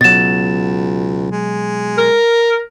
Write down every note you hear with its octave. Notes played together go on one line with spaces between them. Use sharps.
C#2 B2 F#3 A6 E7
G#3
A#4